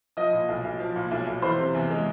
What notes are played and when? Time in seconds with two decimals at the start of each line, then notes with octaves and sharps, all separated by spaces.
0.17 F3 D#5 D#6
0.33 A#2
0.48 B1
0.64 B1
0.80 F3
0.96 A#2
1.11 B1
1.27 B1
1.42 E3 C5 C6
1.58 C3
1.75 E2
1.90 G#3